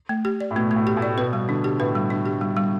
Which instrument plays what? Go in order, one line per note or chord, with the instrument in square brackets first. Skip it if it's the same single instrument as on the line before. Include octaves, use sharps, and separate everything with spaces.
[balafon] A3
G4
D5
[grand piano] A2
[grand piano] B2 [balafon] A3
[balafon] A3
[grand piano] A2
[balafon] G4
[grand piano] A2
[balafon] D5
[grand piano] B2 [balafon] B4
[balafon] G3
[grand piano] D3 [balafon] D4
[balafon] G4
[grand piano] A2 [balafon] B4
[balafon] G3
D4
G4
G3
G3